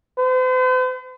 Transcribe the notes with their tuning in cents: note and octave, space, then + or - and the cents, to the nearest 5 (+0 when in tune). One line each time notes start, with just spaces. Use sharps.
C5 -45